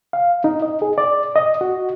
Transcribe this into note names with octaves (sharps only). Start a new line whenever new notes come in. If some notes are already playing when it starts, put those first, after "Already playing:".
F5
D#4
D#5
G#4
D5
D#5
F#4